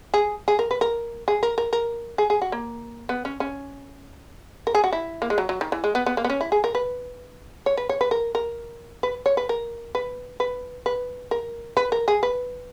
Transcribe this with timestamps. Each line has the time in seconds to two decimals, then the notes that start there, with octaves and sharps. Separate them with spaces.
0.14 G#4
0.48 G#4
0.59 A#4
0.71 B4
0.81 A#4
1.28 G#4
1.43 A#4
1.58 A#4
1.73 A#4
2.18 G#4
2.30 G#4
2.42 F#4
2.52 A#3
3.09 B3
3.25 C#4
3.40 C#4
4.67 A#4
4.75 G#4
4.84 F#4
4.93 E4
5.22 A#3
5.30 G#3
5.38 F#3
5.49 F#3
5.61 D#3
5.72 E3
5.84 G#3
5.95 B3
6.06 B3
6.17 A#3
6.24 B3
6.30 C#4
6.41 E4
6.52 G#4
6.64 A#4
6.75 B4
7.66 C#5
7.77 B4
7.89 C#5
8.01 B4
8.11 A#4
8.35 A#4
9.03 B4
9.26 C#5
9.37 B4
9.49 A#4
9.95 B4
10.40 B4
10.86 B4
11.31 A#4
11.77 B4
11.92 A#4
12.08 G#4
12.23 B4